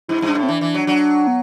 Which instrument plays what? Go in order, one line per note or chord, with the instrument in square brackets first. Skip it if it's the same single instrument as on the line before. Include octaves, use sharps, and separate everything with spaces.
[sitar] G2 [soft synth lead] E4
[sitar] G2
[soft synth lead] D4
[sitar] A2
[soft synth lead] C4
[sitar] E3 [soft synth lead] D4
[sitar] E3
F#3
[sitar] F#3 [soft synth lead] D4
[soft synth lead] B3